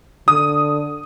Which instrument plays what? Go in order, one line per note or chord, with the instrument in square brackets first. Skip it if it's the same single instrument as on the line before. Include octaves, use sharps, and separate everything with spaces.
[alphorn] D3 [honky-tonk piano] D#6